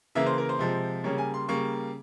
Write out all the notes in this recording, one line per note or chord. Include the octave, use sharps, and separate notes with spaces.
C#3 E3 A#3 E5
C5
A#4
C5
C3 F3 G#3
C#3 G3 A#3 C#5
G#5
C6
C#3 G3 A#3 C#6